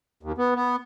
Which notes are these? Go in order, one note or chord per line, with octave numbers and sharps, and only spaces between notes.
D#2
B3
B3